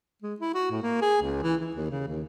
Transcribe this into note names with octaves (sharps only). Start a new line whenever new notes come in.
G#3
E4
F#4
A2
A#3
G#4
C#2
E3
E3
D#2
C#3
D#2